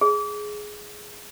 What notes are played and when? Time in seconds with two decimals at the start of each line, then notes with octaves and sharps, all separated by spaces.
0.01 G#4